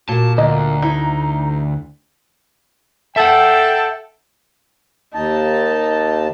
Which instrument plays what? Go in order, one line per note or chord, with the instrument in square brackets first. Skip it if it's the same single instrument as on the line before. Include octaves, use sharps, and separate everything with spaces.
[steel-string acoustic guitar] A#2 A#3 [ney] F#4 [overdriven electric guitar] A5
[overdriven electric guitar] D2 [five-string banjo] D#5 [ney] A#5
[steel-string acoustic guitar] D#4 [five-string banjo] E4
[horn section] A4 G5 [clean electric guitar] E5 F#5
[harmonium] D#2 A5 [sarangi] D#4